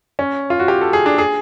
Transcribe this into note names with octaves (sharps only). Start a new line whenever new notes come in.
C#4
F4
F#4
G4
A4
G#4
D4
G#4